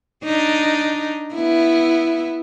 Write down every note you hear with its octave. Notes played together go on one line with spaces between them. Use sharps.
D4 D#4
B3 E4